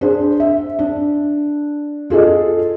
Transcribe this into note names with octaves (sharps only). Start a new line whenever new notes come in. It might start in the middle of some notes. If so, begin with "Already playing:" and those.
D4 G#4 C5
E5
D4
F4 G#4 A4 D#5